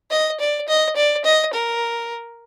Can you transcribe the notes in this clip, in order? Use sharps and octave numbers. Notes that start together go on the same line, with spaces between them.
D#5
D5
D#5
D5
D#5
A#4